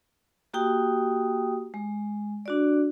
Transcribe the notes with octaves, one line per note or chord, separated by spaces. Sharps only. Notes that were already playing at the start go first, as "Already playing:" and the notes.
A#3 F#4 G4 G5 D#6
G#3
D4 F#4 D5